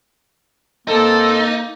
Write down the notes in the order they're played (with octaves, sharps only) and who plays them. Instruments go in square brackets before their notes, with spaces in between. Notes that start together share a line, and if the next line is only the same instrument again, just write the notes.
[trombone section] G#2 C4 A4 [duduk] A#3 [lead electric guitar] D#4